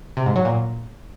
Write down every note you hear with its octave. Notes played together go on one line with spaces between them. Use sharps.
C3
G#2
F#3
A#2